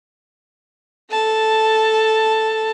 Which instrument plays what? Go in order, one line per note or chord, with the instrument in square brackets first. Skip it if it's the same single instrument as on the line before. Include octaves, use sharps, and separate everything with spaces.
[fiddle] A4 A5